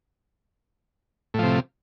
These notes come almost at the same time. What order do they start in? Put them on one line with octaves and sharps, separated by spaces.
A2 F3 C3